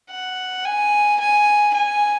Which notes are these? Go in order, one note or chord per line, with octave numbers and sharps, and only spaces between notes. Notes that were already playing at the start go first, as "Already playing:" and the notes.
F#5
G#5
G#5
G#5